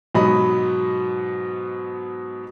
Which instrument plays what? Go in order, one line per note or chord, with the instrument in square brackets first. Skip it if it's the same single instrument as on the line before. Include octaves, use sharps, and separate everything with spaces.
[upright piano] G#2 B2 F#3 D#5 B5